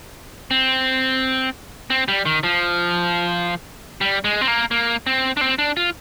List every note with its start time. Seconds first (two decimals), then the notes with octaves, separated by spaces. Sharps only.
0.51 C4
1.90 C4
2.08 G3
2.26 D#3
2.43 F3
4.01 G3
4.24 G#3
4.41 C4
4.48 A#3
4.71 A#3
5.07 C4
5.37 D4
5.41 C4
5.59 D4
5.77 F4